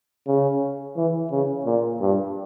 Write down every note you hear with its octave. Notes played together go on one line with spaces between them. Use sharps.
C#3
E3
C#3
A#2
G2